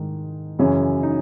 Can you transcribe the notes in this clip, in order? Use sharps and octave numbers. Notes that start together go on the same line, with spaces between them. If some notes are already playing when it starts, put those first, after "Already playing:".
Already playing: G#2 D#3
F#2 C#3 E3 C#4
D#4